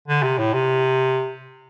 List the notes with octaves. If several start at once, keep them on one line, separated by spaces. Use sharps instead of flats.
D3
C3
A2
C3